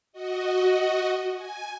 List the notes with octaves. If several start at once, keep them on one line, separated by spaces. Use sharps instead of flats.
F#4 D#5
G#5